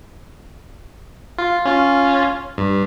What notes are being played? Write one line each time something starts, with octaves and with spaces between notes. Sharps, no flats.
F4
C#4 F4
G2